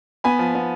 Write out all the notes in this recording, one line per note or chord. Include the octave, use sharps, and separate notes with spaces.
B3 G#5 B5
F3
B3